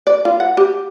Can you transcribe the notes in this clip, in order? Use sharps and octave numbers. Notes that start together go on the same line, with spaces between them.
D5
F4
F#5
G4